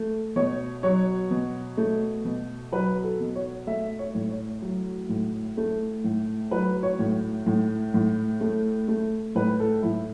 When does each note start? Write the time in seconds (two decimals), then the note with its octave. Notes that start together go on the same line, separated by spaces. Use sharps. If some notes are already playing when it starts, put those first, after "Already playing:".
Already playing: A3
0.36 B2 C#5
0.83 F#3 C#5
1.31 B2
1.77 A3
2.25 B2
2.72 F#3 B4
3.03 A4
3.20 B2
3.35 C#5
3.67 A3 E5
3.99 C#5
4.15 A2
4.30 C#5
4.62 F#3
5.09 A2
5.57 A3
6.04 A2
6.51 F#3 B4
6.83 C#5
6.99 A2
7.46 A2
7.94 A2
8.41 A3
8.88 A3
9.35 A2 B4
9.60 A4
9.82 A2 E4